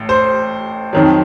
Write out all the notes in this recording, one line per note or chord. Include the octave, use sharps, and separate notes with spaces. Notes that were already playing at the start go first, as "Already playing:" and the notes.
Already playing: A1 A2
C5
F2 D#3 F#3